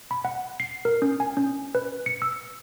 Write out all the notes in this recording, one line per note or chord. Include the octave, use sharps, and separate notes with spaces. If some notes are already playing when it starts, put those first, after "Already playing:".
B5
F#5
C7
A#4
C#4
G#5
C#4
B4
C#7
E6